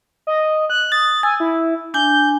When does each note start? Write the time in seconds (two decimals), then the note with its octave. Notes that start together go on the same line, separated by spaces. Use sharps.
0.27 D#5
0.70 F#6
0.92 D#6 A6
1.23 G#5 E6
1.40 E4
1.94 D4 G#5 G6